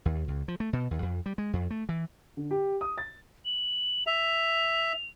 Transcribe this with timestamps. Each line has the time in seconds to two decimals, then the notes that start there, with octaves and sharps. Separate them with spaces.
0.05 D#2
0.28 C#2
0.48 F3
0.60 A3
0.73 B2
0.91 D#2
1.02 F2
1.26 G3
1.38 G#3
1.53 F2
1.71 A3
1.89 E3
2.37 D3
2.51 G4
2.81 D#6
2.98 A6
3.45 F#7
4.07 E5 F7